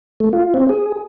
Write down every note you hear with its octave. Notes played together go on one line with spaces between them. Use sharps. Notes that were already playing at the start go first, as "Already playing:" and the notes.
A3
F4
C4
G#4